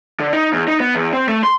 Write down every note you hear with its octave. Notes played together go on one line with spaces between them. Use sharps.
D3
D#4
E2
D#4
B3
E2
C4
A3
C6